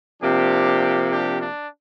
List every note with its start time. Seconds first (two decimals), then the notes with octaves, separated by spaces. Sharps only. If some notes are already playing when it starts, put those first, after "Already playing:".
0.22 C3 F3 A#3 D4 G4
1.11 D4 G4
1.41 D4